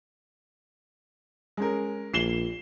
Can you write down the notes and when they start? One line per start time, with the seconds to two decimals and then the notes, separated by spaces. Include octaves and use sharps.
1.57 G#3 C#4 A#4
2.14 A#1 C7 E7 G7